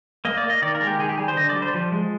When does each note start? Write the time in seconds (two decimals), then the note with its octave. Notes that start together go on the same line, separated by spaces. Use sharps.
0.25 A#3 D#5
0.37 D5
0.43 A#3
0.50 D#5
0.62 D#3 D5
0.75 A#4
0.81 G#3
0.87 G4
0.99 D#3 G#4
1.09 G4
1.18 G3 G#4
1.28 C5
1.36 D3 D#5
1.49 D5
1.56 G3
1.62 C5
1.74 F3
1.92 G#3